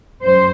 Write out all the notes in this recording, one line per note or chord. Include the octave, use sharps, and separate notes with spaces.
F#2 C5